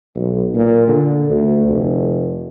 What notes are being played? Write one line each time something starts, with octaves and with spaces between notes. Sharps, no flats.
B1
A#2
D3
D2
F1